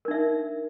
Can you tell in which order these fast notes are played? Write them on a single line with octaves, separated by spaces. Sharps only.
A#4 D4 E5 D#4